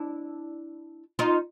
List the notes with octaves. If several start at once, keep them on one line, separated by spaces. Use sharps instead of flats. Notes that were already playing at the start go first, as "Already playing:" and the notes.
Already playing: D4 E4
D#4 F4